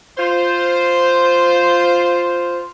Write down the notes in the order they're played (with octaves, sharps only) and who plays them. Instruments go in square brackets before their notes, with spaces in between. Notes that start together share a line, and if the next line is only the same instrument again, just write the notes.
[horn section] F4 C5